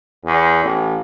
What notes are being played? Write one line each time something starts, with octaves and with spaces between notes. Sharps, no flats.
E2
A1